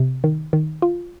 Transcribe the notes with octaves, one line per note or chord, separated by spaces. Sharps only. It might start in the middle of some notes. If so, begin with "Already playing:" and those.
Already playing: C3
D#3
D#3
F4